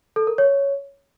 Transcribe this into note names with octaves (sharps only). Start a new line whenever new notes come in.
A4
A#4
C#5